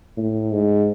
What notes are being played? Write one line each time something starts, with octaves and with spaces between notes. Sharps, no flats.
A2
G#2